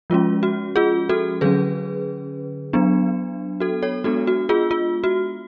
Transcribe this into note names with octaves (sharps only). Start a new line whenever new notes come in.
F3 G#3 C#4 F4
F#4
F4 G#4
F#4 A4
D3 F#3 C#4 G#4 B4
F#3 B3 D4
F#4 A4
A4 C#5
G#3 B3 D4 F#4 A4
F#4
F4 G#4
F4
F#4